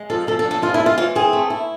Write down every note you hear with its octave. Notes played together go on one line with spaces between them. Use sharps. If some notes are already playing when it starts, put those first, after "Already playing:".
Already playing: G#3
F3 A4
F3 A4
A4
D4
A4
G#3 F4
E4
F3
F4
E3 F4
C4 G#4
A3
E4